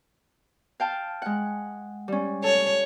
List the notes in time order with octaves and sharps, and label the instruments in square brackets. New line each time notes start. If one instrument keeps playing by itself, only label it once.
[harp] F5 G5 A5
G#3 F#5
G3 C#4
[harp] A4 [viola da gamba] C#5